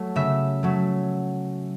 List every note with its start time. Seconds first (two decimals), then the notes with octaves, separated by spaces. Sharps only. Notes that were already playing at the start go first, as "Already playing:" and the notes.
Already playing: F#3 A3
0.16 C#3 E5
0.63 F#3 A3